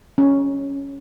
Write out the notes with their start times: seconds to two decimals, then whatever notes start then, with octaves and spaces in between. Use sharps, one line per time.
0.18 C#4